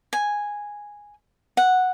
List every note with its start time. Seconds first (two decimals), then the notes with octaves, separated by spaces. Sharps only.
0.13 G#5
1.57 F#5